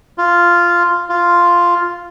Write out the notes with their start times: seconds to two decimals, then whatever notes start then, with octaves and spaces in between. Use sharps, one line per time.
0.18 F4
1.09 F4